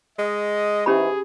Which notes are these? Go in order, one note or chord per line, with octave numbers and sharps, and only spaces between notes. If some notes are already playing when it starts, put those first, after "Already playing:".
G#3 D#5
G#2 E3 C#4 G4 G#4 B5